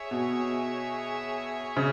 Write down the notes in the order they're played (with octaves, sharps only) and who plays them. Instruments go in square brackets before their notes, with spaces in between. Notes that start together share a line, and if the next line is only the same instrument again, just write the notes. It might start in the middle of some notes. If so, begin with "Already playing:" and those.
Already playing: [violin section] G#4 C#5 E5
[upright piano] B2
C#3